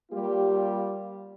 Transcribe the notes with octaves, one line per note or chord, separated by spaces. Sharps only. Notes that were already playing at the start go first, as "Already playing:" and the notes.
G3 A#3 F4 G4